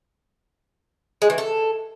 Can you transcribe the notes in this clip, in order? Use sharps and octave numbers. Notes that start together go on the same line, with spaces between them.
G#3
E3
A4